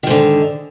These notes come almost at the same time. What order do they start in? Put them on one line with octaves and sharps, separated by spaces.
D#3 G#2 D3